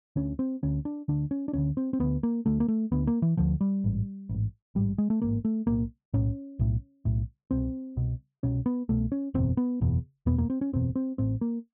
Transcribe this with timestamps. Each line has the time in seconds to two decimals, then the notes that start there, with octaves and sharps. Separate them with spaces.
0.16 D2 D3 C#4
0.39 C4
0.63 D2 D3 C#4
0.85 D4
1.08 D2 D3 D4
1.31 C#4
1.48 D4
1.53 D2 D3 C#4
1.77 C4
1.93 C4
2.00 D2 D3 B3
2.23 A#3
2.46 D2 D3 A3
2.60 A#3
2.68 A3
2.92 D2 D3 B3
3.07 A#3
3.22 E3
3.37 D2 D3 F3
3.61 G3
3.84 A1 G#2
4.29 A1 G#2
4.75 A1 G#2 G3
4.98 G#3
5.10 A3
5.22 A1 G#2 A#3
5.45 A3
5.67 B1 A2 A#3
6.14 B1 A2 C#4
6.59 B1 A2
7.05 B1 A2
7.51 C2 B2 C4
7.96 C2 B2
8.43 C2 B2 C#4
8.66 B3
8.89 C2 B2 A3
9.12 C#4
9.34 F#1 E2 B2 C4
9.57 B3
9.81 F#1 E2 B2
10.26 F#1 E2 B2 B3
10.38 A#3
10.50 C4
10.61 C#4
10.73 F#1 E2 B2 C4
10.96 C4
11.18 A1 A2 C4
11.41 A#3